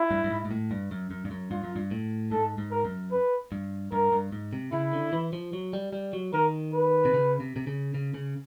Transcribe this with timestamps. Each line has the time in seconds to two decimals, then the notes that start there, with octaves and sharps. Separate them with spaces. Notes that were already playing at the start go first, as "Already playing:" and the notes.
Already playing: E4
0.11 G2
0.24 G2
0.31 G#2
0.45 G#2
0.51 A2
0.71 G2
0.91 F#2
1.11 F#2
1.25 G2
1.31 F#2
1.51 G2 F4
1.64 F#2
1.76 G2
1.91 A2
2.32 G#2 A4
2.58 G#2
2.71 A#4
2.85 F#2
3.12 B4
3.52 G2
3.92 G2 A#4
4.12 G2
4.32 G#2
4.53 C3
4.72 C#3 E4
4.93 D3
5.13 E3
5.33 F3
5.53 F#3
5.73 G3
5.93 G3
6.13 F#3
6.33 D#3 A#4
6.74 B4
7.05 C3
7.14 C#3
7.40 C3
7.56 C3
7.67 C#3
7.94 C#3
8.14 C#3